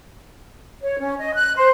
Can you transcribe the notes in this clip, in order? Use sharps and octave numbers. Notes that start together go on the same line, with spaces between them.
C#5
C#4
D#5
F#6
C5